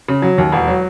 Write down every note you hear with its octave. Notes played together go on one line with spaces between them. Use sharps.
C#3
F#3
D#2
E1
F#3